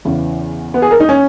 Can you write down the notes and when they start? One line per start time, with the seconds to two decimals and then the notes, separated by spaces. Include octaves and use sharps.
0.05 E2 C#3 E3
0.74 B3
0.82 G#4
0.91 A#4
1.00 D#4
1.09 C#4